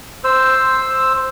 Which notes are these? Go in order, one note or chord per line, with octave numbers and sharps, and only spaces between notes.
C5 E6